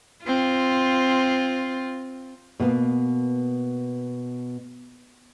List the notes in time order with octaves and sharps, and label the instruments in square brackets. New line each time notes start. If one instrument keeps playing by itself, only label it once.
[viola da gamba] C4 F4
[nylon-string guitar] B2 A#3 B3